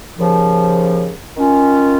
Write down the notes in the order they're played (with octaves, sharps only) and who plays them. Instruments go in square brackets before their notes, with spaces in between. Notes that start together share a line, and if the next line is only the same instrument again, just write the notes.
[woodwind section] D#2 C#3 F3
D#3 A#3 C#4 F4